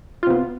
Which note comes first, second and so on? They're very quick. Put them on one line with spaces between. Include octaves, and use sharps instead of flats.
F4 C3 B3